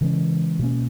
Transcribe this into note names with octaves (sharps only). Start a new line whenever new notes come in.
C#3 E3 G#3 C#4
B2 A#3 C#4